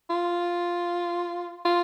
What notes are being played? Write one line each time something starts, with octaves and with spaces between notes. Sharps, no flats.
F4
F4